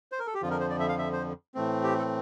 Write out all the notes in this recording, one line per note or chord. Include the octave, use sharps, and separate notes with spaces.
C5
A#4
A4
G4
F2 D3 F3 F4
A#4
C5
D5
E5
F5
E5
C5
A2 E3 A3 C4
G4
A4